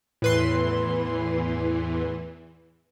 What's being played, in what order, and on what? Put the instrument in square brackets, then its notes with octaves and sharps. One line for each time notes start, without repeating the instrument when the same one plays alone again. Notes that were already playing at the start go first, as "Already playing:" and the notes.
[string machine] E2 E3 [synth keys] A2 B4 C6